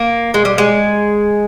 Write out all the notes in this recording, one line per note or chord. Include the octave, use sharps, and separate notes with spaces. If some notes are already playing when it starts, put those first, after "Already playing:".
Already playing: A#3
G#3
G3
G#3